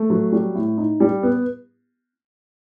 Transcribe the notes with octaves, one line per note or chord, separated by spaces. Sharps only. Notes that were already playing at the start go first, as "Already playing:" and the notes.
Already playing: A3
F#3
G3
A2
D#4
G3
B3